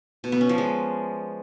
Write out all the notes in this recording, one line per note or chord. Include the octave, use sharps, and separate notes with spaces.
B2
B3
C#4
F3
G#3